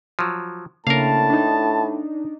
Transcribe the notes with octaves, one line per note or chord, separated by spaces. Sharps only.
F3 F#3
A2 C#3 A#3 D4 A#4 F5 A5
D4 D#4